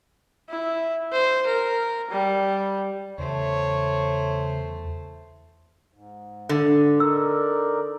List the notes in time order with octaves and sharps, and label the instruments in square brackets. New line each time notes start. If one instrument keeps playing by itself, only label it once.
[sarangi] E4
C5
A#4
G3
[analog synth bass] E2 [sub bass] C#3 [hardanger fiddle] A3 C5 [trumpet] C#5
[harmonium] G#2
[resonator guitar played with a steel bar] D3
[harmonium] D#4 A#4 D5 [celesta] E6